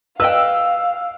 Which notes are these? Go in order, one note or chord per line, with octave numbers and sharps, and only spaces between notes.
B4 D#5 F5 G5 E6